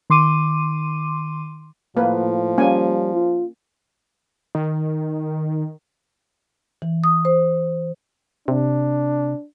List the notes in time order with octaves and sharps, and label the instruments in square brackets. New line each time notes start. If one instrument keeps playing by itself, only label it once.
[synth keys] D#3 C6 D6 D#7
[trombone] A2 [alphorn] F3 [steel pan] A#3 B4
[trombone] G3 [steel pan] A#3 C#4 G#5
[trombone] F4
[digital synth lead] D#3
[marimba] E3
D#6
C5
[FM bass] C3 [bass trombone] D4